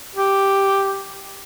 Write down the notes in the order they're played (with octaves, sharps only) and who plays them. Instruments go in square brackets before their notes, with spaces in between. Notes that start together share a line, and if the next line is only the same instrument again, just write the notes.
[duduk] G4